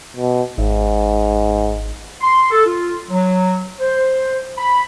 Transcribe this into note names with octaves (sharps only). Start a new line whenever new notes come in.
B2
G#1 G#2
C6
A4
F4
F#3
C5
B5